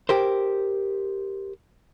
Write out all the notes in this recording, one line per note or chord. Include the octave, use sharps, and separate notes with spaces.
G4 A#4 C5